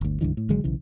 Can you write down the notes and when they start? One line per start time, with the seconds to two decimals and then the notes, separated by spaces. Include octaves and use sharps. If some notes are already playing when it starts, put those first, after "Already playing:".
0.01 G1 D2
0.21 C#2 G2 D3 E3
0.37 A2
0.49 G#1 D3 F#3 G#3
0.64 B1 C#3 E3